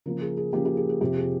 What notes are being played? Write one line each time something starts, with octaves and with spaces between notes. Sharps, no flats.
C#3 F3 A#3 A#4
G#4
G#4
C#3 F3 A#3 G4
G4
G#4
G#4
F2 C3 F3 G4
G#4